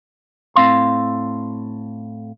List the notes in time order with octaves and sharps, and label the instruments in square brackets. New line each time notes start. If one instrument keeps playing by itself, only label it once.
[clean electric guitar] A2 C4 F5 C6